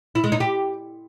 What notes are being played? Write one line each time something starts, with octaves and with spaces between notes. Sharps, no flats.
E4
G#3
D#4
G4